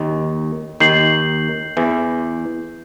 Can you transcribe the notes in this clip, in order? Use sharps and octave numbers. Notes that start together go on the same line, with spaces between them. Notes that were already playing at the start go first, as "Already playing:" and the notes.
Already playing: D#2 D#3
D#2 D#3 G6 C7 F#7
E2 E3